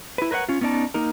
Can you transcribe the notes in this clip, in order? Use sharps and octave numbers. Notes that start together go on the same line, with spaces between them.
E4 B4
A#4 B4 C#5 E5 F#5
C#4 F4
B3 C#4 D#4 D5 A5
A#3 D#4 A#4